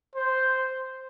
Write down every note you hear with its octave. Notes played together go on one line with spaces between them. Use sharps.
C5